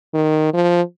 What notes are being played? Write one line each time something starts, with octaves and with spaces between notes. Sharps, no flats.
D#3
F3